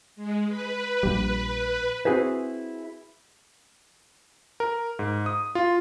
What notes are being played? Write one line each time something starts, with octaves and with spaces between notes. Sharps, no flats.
G#3
B4
A#1 G3
C4 E4 F#4 G#4 B4 C5
A#4
G#2
D#6
F4